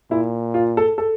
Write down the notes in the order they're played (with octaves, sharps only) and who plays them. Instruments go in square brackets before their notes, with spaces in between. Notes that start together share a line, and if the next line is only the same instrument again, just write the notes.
[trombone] A#2 [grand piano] E4
[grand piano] F4
A4
A4